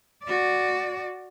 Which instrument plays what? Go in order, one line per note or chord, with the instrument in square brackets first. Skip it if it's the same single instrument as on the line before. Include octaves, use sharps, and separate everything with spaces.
[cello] F#4 D5